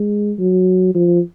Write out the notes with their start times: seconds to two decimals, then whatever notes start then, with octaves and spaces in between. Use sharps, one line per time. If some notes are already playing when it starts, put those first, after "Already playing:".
Already playing: G#3
0.39 F#3
0.94 F3